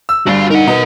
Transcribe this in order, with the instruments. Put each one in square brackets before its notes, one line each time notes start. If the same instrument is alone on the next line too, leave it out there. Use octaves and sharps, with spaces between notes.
[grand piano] E6
[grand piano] G1 G2 [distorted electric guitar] F#4 F5
[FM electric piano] D#4 [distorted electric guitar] A#4 F#5
[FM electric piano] B2 B3 [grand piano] D#4